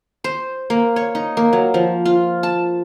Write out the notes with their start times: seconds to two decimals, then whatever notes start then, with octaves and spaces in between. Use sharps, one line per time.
0.24 C5
0.70 A#3
0.96 C#5
1.15 D#4
1.37 A#3
1.53 F#3
1.74 F3
2.05 F4
2.43 A5